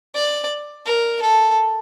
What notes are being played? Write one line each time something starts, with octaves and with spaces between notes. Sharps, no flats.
D5
A#4
A4